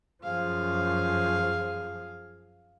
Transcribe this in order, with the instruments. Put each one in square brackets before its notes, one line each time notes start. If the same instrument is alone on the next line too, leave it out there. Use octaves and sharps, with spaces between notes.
[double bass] F#2 F3 [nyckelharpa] G#4 F5